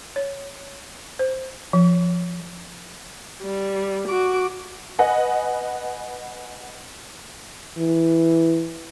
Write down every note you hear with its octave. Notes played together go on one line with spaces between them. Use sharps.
C#5
C5
F3
G3
F#4 D6
B4 D#5 F#5 G#5
E3